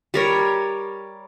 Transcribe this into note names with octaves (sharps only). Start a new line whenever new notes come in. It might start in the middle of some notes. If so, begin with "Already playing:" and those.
G3 A#4 C#5